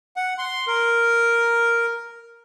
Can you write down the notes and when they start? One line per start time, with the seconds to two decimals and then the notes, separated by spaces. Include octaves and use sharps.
0.16 F#5
0.38 C6
0.67 A#4